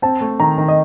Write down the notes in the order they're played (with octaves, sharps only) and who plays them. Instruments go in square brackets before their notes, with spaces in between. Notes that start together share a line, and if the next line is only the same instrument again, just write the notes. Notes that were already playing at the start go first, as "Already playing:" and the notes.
[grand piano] C4 [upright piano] A5
[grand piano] A3
[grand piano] D#3 [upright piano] A#5
[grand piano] D#3
[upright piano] D#5